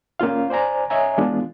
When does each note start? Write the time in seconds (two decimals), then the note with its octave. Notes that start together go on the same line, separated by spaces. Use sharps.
0.19 A#3 C#4 F4 F5
0.50 C5 D5 G#5 A#5
0.90 C#5 D#5 E5 G#5 A#5
1.18 E3 G#3 B3 D4 F4